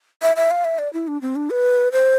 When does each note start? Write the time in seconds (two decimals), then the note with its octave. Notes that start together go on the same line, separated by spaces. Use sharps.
0.22 E5
0.36 E5
0.51 F5
0.65 E5
0.79 D5
0.93 E4
1.08 D4
1.22 C4
1.36 D4
1.50 B4
1.92 C5